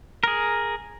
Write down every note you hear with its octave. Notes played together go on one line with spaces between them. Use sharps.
G#4 A#4